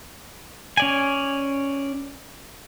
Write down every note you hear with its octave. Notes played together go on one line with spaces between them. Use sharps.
C#4 D5 G#5